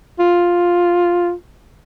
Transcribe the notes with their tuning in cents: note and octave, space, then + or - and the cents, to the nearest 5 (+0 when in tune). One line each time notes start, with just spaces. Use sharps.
F4 +5